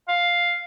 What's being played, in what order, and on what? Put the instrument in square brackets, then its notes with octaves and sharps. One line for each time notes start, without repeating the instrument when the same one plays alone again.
[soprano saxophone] F5